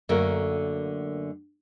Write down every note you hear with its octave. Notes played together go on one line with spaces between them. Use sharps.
F#2 D3 A3 A#3 F#4 A#4